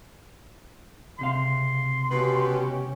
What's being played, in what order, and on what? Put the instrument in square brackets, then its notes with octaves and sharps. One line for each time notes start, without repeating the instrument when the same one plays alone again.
[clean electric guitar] C#2 C3 F5 [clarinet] C6
[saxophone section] B2 B4 [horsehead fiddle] C#4 G4